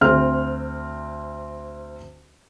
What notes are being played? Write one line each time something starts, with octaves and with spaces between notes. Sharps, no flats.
D2 C4 F6